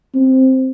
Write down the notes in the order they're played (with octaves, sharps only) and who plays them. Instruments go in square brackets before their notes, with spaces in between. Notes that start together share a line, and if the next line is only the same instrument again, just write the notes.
[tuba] C4